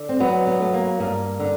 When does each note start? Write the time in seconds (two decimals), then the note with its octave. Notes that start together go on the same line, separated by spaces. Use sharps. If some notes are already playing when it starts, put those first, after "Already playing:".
Already playing: D3
0.09 C4
0.20 F#3 B3
0.47 B3
0.60 A3
0.74 A#3
1.00 G2 A#3
1.40 D3